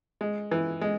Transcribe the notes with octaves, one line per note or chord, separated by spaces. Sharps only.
G#3
E3
G#3